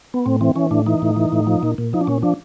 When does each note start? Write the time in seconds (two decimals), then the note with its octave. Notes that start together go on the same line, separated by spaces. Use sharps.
0.14 B3
0.26 A2 C4
0.41 E3 C4
0.56 E3 C#4
0.71 A2 D4
0.86 E3 D#4
1.02 A2
1.16 E3
1.32 A2
1.47 F3
1.63 A#2
1.78 A#2
1.93 F3 D#4
2.01 D4
2.07 A#2 C#4
2.23 F3 D4